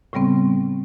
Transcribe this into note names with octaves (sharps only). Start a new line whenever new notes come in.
A2 C#3 G3 B3 C4